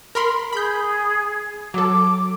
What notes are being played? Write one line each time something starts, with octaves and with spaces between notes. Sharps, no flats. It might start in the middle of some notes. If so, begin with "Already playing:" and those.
A#4 B5 C6
G#4 B5 G6
F#3 A4 D6